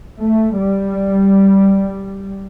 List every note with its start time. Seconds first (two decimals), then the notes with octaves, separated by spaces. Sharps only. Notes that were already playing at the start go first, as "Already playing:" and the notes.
0.20 A3
0.56 G3